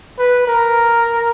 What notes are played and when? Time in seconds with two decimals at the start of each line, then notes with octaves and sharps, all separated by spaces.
0.19 B4
0.48 A#4